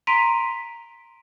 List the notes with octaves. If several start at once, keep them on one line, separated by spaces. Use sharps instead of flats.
A#5 C6 B6 D7 D#7 F7